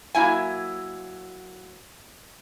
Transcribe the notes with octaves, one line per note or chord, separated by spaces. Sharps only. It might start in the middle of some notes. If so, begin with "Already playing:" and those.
F#3 A#3 E4 E5 G#5